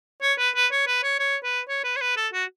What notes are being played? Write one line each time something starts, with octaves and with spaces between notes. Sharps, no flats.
C#5
B4
B4
C#5
B4
C#5
C#5
B4
C#5
B4
C#5
B4
A4
F#4